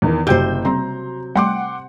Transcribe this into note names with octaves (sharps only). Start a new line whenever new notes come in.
E2 D#3
F#1 F#2 C3 F#3 G3 C5 G5 G6
C#3 G3 C4 A#5 C6
G3 A3 F#5 G5 C6 D6